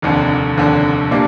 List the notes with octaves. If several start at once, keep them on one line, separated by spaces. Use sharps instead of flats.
F1 D#2 D3
F1 D#2 D3
A#2 G3 A#3 D4